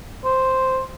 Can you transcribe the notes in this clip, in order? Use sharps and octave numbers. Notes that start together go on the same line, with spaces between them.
C5